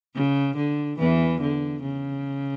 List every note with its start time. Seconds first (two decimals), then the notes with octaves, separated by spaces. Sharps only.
0.15 C#3
0.57 D3
0.99 E2 E3
1.41 D3
1.82 C#3